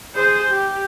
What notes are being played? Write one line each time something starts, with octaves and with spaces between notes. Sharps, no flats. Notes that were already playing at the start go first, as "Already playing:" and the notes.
G#4 C5
G4